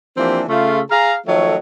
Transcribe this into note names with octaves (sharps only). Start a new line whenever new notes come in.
E3 F3 A#3 C4 D4 G4
C#3 A3 F4
G#4 F5 A#5
D#3 F3 F#3 A3 A4 C#5